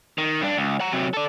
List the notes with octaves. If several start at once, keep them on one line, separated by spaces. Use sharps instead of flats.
D#3
G2 D4
C#2
F#5 A#5
C3 F#3
A4 D5